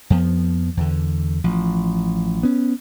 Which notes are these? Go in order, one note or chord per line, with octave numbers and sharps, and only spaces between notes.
F2 F3 B3
E2 D3
A1 F3
B3 C#4